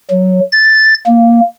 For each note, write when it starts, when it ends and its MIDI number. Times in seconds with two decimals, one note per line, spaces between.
0.11 0.40 54
0.52 0.94 93
1.06 1.40 58